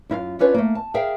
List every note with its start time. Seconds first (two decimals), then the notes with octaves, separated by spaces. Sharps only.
0.10 F#2 E4 F4 F5
0.39 C#4 D4 F4 B4 C#5
0.54 A3 A#3
0.75 A5
0.94 G#4 A#4 E5 F5 G5